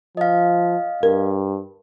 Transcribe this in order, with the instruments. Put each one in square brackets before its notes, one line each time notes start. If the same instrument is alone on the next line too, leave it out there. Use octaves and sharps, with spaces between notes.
[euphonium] F3 [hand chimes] D#5 F5
[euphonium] G2 [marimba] A#4